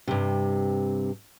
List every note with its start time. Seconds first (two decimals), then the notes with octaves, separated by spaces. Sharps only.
0.07 G2 C3